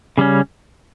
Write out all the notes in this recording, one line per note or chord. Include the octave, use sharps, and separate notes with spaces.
C#3 G3 C#4